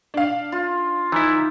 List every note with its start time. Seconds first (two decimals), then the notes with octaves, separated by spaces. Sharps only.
0.14 D4 F5
0.52 F4
1.12 E3 D#4 E4